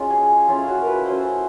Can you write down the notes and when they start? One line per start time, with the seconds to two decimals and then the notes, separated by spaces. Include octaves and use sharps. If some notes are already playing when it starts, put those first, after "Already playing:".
Already playing: G#3 C#4 F4
0.10 G#4
0.48 A3 C#4 E4 F4
0.67 F#4
0.81 A#4 B4
1.06 A3 C#4 E4 C5